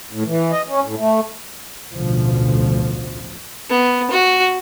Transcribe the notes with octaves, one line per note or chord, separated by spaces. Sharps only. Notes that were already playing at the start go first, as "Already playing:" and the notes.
A2
E3
D#5
C#4
A2
A3
A1 D2 B2 F3
B3
F#4